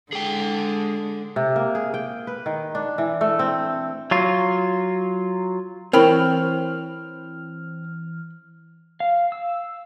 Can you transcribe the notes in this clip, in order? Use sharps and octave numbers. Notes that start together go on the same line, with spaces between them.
D3 G#3 G#4 G5
C3
A#3
G#4
G5
B4
D#3
D4
E3
A3
C4
F#3 F4
E3 C4 A#4 C#5 G5 B5 F6
F5
E6